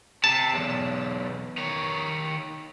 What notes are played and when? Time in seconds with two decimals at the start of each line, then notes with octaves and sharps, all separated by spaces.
0.24 C3 A5
0.54 B1 E2
1.58 D#3 C#5